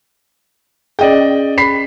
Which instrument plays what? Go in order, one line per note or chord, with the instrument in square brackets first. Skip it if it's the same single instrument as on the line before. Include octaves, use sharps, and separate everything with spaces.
[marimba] C#4 G#4 [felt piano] D5 D#5 G5
[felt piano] B5 B6 C7